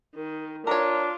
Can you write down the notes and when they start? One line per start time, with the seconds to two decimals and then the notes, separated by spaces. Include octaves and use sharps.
0.15 D#3
0.67 D4 F4 A#4 C#5